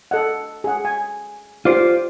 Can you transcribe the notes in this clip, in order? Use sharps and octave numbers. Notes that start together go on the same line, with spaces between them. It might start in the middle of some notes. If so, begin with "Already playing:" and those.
A4 D#5 F#5
G#4 F#5
G#5
F4 G4 C5 D5 D6